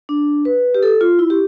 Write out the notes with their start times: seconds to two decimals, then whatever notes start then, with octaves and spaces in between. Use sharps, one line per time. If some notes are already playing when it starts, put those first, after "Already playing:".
0.09 D4
0.45 B4
0.75 G4
0.83 A4
1.01 F4
1.19 E4
1.30 G4